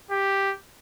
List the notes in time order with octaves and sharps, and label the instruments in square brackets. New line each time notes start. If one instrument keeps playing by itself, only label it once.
[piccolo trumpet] G4